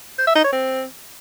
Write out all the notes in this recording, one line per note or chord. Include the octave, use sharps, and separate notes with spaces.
C5
E5
D#4
C#5
C4